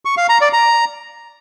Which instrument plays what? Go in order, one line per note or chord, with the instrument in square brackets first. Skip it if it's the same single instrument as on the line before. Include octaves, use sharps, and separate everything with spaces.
[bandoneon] C#6
F5
A#5
D5
A#5